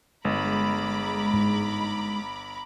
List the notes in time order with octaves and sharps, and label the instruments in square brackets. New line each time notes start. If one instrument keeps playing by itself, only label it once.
[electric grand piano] G1 [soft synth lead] G#3 [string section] A#5 B5 D6
[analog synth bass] G#2